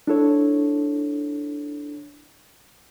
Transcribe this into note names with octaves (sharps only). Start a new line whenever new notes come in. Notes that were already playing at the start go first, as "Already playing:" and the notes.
D4 E4 A4 C#5